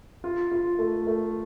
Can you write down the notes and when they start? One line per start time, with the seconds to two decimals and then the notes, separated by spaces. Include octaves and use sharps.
0.24 F4
0.51 F4
0.79 A3
1.07 A3